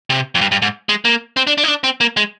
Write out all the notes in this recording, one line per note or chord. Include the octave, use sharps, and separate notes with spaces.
C3
F2
G2
G2
G#2
G#3
A#3
C4
D4
D4
D#4
D4
C4
A#3
G#3